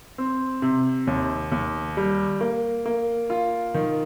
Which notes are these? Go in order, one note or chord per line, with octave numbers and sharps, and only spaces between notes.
C4
C3
D#2
D#2
G3
A#3
A#3
F4
D#3